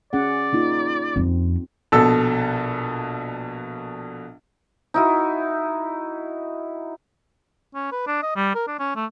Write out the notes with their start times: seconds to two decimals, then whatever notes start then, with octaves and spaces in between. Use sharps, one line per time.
0.13 C#4 G#4 D5 F#5
0.53 A#3 D#4 F4
1.16 F2 C4
1.92 A#1 B2 A4 E6
4.94 D#4 E4 F#4
7.75 C#4
7.92 B4
8.07 D4
8.23 D#5
8.36 G3
8.55 A#4
8.67 D4
8.79 C#4
8.96 A3